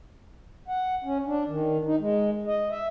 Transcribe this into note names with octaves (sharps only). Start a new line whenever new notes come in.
F#5
C#4
D4
D#3
D#4
G#3
D#5
E5